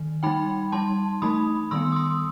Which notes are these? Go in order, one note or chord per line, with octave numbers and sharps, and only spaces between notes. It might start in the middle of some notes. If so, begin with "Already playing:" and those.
Already playing: D#3
G3 D#4 G5 B5
G3 D#4 A5 C6
E3 A3 D#4 B5 D#6
D#3 G3 B3 C6 E6
D#6
C6 E6